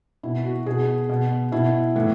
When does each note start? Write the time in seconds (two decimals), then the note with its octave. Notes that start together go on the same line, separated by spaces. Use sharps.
0.23 B2 E4
0.45 F#4
0.66 B2 G#4
1.09 B2
1.52 B2 E4
1.95 A2 E3